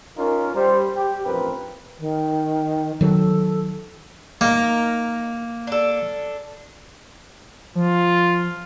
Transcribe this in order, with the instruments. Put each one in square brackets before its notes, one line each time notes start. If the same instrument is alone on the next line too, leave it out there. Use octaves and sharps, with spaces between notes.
[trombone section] C#4 D#4 F4 A#4
G3 C5
G4
A1 G2 F3 C4 A#4 B4
[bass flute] D#3
[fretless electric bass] D#3 F#3 [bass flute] A4
[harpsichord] A#3 [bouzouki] D#4 A#4
[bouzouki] D4 A4
[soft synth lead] F3 [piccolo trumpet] F4